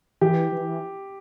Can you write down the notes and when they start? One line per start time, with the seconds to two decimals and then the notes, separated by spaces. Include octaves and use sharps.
0.21 E3 G4
0.52 E3